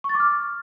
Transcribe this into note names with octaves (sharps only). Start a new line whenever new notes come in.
C#6
A6
D6
F6